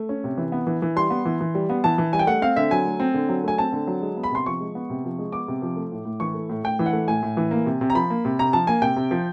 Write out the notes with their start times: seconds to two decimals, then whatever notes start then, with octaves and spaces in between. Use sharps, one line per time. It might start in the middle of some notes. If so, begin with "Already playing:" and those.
Already playing: A3
0.09 C#4
0.24 C3
0.38 E3
0.52 B3
0.67 E3
0.82 E3
0.96 G3 C6
1.10 B3
1.25 E3
1.41 E3
1.55 G3
1.70 B3
1.84 E3 A5
1.98 E3
2.13 G3 G#5
2.19 G5
2.27 A3 F#5
2.42 C4 F5
2.56 D3 E5
2.71 F#3 G#5
2.85 A3
3.00 C4
3.14 D3
3.29 F#3
3.44 A3 G#5
3.58 C4 A5
3.72 D3
3.87 F#3
4.02 G#3
4.17 B3
4.23 B5
4.31 C3 C6
4.46 F3 C#6
4.61 G#3
4.75 B3
4.90 C3
5.05 F3
5.19 G#3
5.32 B3 D6
5.48 C3
5.62 F3
5.76 A3
5.92 A2
6.05 A2
6.20 E3 C#6
6.34 A3
6.49 A2
6.64 A2 G5
6.79 E3
6.86 F#5
6.93 A3
7.08 A2 G#5
7.23 A2
7.37 E3
7.51 A#3
7.66 C3
7.81 C3
7.90 A#5
7.95 F3 B5
8.10 A#3
8.25 C3
8.39 C3 A#5
8.53 F3 A5
8.67 A#3 G#5
8.82 C3 G5
8.96 C3
9.11 F3